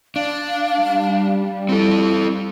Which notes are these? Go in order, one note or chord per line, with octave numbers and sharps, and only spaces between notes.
D4 F5
G3
C4 E4 A4